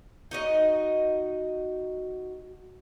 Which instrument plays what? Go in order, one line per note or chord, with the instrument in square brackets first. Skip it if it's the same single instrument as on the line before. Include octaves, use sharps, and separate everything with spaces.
[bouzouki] D#4 F#4 D#5